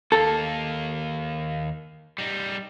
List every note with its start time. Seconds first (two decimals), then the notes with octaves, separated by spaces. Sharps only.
0.12 D#2 A#3 A4
2.18 G3 D#4